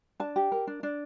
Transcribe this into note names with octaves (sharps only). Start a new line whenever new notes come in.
D4 A5
G4
A#4
D4
D4